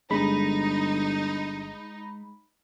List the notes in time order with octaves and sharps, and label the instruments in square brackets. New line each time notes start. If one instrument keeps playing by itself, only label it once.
[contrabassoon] G1 [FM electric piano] G#3 B5 [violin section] D#4